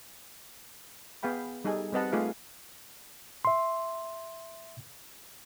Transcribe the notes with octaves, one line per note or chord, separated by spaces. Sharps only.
B3 G#4 F5 G5 B5
G3 D#4 G#4 A4 G#5
G3 C4 B4 D#5 F#5 A5
A3 D#4 F4 G#4 B4 F5
E5 C6